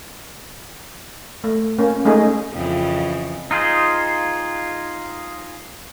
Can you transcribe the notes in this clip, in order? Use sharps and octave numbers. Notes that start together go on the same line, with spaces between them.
A3
A#3 C#4
G#3 A3 C#4 D#4 G#4
F2 C#3 E3
D#4 F4 G#4 C5